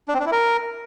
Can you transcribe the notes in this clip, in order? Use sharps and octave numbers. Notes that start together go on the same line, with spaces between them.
D4
C4
D4
E4
A#4